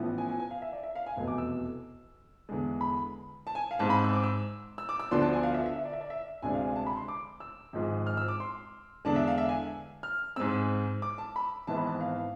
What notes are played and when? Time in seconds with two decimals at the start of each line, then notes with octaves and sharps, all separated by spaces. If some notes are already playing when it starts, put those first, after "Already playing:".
Already playing: A1 A2 F3 B3
0.18 G#5
0.29 G#5
0.40 G#5
0.51 F5
0.62 E5
0.72 D5
0.83 E5
0.96 F5
1.06 G#5
1.17 F1 E2 B2 A3 G#5
1.28 D6
1.38 E6
2.49 E2 D3 G#3
2.81 B5
3.47 A5
3.55 G#5
3.71 F5
3.79 G#2 G#3 C4 A5
3.90 B5
4.04 E6
4.13 D6
4.24 E6
4.78 E6
4.89 D6
5.00 E6
5.11 D2 D3 F3 B3 D4 C6
5.22 A5
5.33 G#5
5.43 F5
5.54 E5
5.66 E5
5.76 E5
5.85 D5
5.93 E5
6.01 D5
6.10 E5
6.42 D2 C3 G#3 D4 G#5
6.54 F5
6.64 G#5
6.76 A5
6.87 B5
6.97 C6
7.08 D6
7.40 E6
7.73 G#1 G#2 F3 G#3
8.06 F6
8.17 E6
8.28 D6
8.40 C6
9.05 E2 D3 G#3 D4 A5
9.16 E5
9.27 F5
9.38 E5
9.49 G#5
10.03 F6
10.36 G#2 G#3 C4 E6
11.02 D6
11.18 A5
11.36 B5
11.67 G#1 G#2 E3 B3 A5
11.77 B5
11.87 A5
12.01 F5